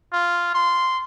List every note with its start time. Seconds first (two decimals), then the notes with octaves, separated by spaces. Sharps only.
0.13 F4
0.55 C6